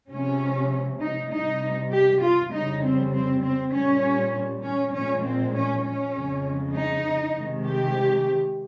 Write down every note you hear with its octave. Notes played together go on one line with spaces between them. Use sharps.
C3 F3 G#3 C#4
D#4
C3 G3 D#4
G4
F4
F2 C#3 G3 D#4
C4
C4
C4
A#2 G3 C#4
C#4
A#2 F3 G#3 C#4
C4
C#4
C#4
F2 C#3 G#3
D#4
C3 D#3 G#3
G4